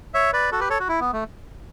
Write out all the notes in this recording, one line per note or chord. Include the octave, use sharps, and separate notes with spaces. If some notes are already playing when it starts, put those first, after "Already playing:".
C#5 E5
B4 D5
F#4 A4
G4 B4
A4 C#5
F#4
E4
B3
A3